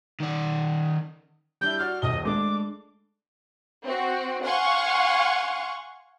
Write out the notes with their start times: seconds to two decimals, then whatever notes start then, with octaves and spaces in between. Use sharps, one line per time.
0.20 D#3 D5
1.61 G3 D4 E4 G6
1.79 F#4 D5 F6
2.02 D#1 A#1 D#5 G7
2.25 G#3 A3 D4 D6
3.84 C4 F#4
4.44 F5 F#5 G#5 C6 C#6